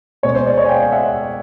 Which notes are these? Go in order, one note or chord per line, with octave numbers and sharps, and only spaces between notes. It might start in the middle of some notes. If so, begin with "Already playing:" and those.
B2 G#3 C#4 C#5
C5
C5 D5
C#5 D#5
G#5
F5 G5
E5 F#5